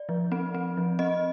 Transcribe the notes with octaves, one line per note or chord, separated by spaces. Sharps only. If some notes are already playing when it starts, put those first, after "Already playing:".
Already playing: D5
F3
C4
C4
F3
C4 D#5